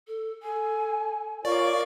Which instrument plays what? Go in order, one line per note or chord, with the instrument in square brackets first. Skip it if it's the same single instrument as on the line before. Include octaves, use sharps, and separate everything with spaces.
[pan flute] A4
[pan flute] A4 [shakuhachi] G#5
[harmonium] F4 A#4 C#5 [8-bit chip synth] D5 [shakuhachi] F5 [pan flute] C#6